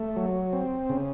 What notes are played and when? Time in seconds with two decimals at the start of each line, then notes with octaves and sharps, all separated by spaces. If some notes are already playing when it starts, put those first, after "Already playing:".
Already playing: A3
0.16 F#3
0.53 C4
0.89 C#3